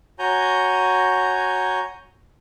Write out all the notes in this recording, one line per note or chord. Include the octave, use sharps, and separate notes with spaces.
F#4 C#5 G#5 A#5 G6